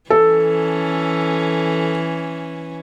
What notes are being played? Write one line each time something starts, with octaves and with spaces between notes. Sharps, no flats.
E3 C#4 A4